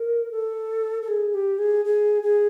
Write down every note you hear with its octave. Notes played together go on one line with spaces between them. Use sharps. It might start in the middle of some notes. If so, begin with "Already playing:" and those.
Already playing: A#4
A4
A4
G#4
G4
G#4
G#4
G#4